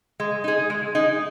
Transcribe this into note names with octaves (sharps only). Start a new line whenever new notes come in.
G#3
D#4 G#4
G#3
D#4 G#4